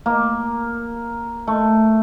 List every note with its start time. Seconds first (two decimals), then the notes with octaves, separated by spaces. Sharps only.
0.06 A#3
1.47 A3